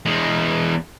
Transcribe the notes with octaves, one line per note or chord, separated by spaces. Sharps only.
E2 G#3